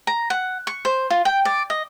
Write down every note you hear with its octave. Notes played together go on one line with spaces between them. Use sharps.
A#5
F#5
C#6
C5
F4
G5
D5
D#5